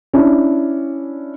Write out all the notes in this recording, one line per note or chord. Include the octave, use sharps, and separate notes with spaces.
C#4 D4 E4